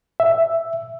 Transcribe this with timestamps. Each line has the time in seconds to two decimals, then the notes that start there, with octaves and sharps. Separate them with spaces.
0.20 E5